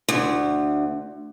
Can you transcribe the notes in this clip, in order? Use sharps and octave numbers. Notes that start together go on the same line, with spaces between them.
D2